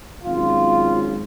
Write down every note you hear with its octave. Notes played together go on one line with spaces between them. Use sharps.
G#1 G#2 F#3 C#4 F4